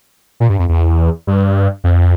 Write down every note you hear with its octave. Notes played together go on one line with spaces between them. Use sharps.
A#2
G2
F2
E2
G2
F2